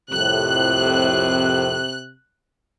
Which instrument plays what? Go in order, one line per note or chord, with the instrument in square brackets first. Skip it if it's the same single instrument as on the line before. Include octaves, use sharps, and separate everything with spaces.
[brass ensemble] C2 F2 A2 [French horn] C3 [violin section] F#6